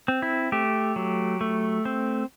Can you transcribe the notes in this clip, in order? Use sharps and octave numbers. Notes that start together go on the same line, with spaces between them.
C4
E4
A3 G4
F#3
A3
C4